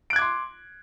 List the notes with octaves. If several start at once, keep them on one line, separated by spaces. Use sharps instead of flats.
C6 D6 F#6 G#6 D7